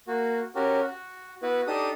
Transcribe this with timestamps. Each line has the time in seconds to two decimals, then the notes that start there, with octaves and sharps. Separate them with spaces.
0.08 A#3 F#4
0.55 C#4 F#4 G4 A#4
0.83 F#4
1.42 B3 E4 F#4 B4
1.67 D4 D#4 G4 A4 D#6